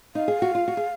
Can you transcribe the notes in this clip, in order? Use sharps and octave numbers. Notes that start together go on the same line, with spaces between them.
D#4 F5
G#4
F#4
F4
F#4
G#4